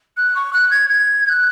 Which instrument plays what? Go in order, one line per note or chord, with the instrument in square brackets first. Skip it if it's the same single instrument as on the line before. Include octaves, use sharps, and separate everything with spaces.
[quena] F#6
C#6
F#6
G#6
G#6
G#6
F#6